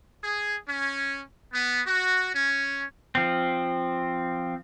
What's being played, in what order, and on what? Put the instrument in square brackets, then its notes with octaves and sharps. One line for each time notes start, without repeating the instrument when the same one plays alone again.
[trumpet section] G#4
C#4
B3
F#4
C#4
[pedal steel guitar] F3 C4